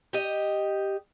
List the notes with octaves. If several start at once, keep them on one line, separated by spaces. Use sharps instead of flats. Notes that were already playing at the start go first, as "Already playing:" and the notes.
G4 D#5